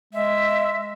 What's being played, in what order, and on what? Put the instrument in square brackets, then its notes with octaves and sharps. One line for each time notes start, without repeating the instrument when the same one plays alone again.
[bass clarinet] G#3 [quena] E5